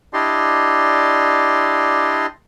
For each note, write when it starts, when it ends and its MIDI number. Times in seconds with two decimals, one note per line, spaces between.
0.13 2.26 62
0.13 2.26 64
0.13 2.26 67
0.13 2.26 74
0.13 2.26 75
0.13 2.26 84